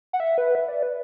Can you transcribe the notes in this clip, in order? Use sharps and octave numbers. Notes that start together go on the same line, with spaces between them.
F#5
E5
B4
E5
D5
B4